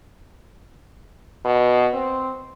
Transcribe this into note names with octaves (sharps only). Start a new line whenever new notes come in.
B2
C4